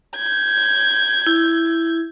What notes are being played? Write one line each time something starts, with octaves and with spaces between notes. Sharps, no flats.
G6 G#6
E4